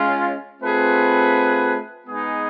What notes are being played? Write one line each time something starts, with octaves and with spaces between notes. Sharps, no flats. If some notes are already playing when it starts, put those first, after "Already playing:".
Already playing: G#3 C#4 F4
A3 C4 F4 G#4 B4
G#3 B3 D#4 G#4 B4